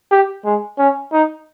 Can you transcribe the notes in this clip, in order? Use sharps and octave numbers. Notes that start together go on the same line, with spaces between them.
G4
G#3
C#4
D#4